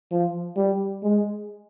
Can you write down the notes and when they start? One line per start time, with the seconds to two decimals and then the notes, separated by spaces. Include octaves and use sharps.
0.12 F3
0.57 G3
1.03 G#3